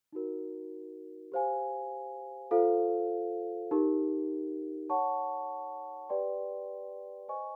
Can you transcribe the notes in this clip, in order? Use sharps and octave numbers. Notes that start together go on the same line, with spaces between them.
D#4 F#4 A#4
G4 C5 F5 G#5
F4 A4 C5 F5
D#4 G4 A#4
C#5 F#5 A5 C#6
G4 B4 D5 G5 C6
C5 D#5 G#5 C#6